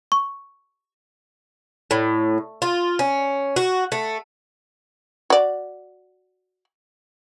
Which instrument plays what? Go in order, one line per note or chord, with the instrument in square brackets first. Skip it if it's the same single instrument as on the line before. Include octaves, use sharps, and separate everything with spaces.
[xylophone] C#6
[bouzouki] A2
F4
C#4
F#4
A3
[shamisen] F#4 D5